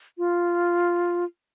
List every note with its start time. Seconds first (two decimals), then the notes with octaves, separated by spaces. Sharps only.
0.18 F4